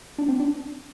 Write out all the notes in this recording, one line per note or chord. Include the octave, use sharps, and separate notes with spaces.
D4
C4
D4